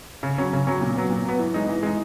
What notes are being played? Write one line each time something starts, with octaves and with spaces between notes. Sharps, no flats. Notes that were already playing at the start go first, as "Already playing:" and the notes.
C#3
F#3 C#4
C#3
F#3 C#4
A#2
F#3 B3
A#2
F#3 B3
E3
G#3 D#4
E3
G#3 D#4